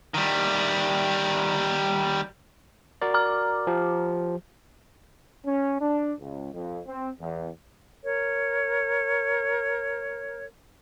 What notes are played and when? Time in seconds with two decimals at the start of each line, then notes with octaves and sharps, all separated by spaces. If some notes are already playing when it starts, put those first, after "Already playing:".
0.14 D#3 G3
3.02 F#4 A#4 D5
3.14 A#5 D6 F6
3.67 F3 G4
5.45 C#4
5.80 D4
6.20 C#2
6.54 F2
6.87 C4
7.20 E2
8.05 A#4 C#5